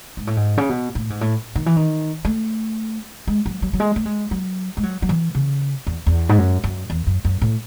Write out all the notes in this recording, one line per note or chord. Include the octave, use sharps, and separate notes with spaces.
G#2
A2
G#2
C#3
B2
A2
G#2
A2
D#3
E3
D#3
A3
G#3
F#3
F#3
F#3
G#3
A3
G#3
F#3
G#3
F#3
F#3
E3
C#3
E2
E2
G#2
F#2
F#2
E2
F#2
F#2
A2